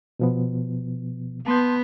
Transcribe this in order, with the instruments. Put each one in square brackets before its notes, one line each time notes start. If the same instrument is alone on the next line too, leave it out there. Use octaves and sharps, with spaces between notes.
[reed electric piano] B2 F3 B3
[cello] B3 [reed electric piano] A5 C6 G6